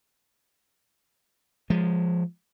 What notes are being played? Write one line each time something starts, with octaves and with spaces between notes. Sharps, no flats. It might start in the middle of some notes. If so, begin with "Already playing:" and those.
F3 G#3